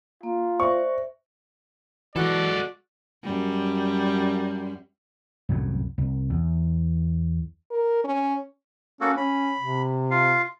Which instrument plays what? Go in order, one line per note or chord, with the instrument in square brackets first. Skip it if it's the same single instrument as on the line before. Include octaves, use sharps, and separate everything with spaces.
[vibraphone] A#3 [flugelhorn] F4
[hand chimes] C5 E5 [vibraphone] D5 [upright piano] C#6
[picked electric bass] E3 [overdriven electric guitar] G#3 A4 [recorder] F#4 [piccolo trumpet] D5
[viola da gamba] F#2 G3
[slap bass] C2 F#2 A2 F#3
C2
E2
[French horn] A#4
C#4
[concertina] A#3 F#4 A4 [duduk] C#4
[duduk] C#4 [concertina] B5
[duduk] C3
[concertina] F4 F5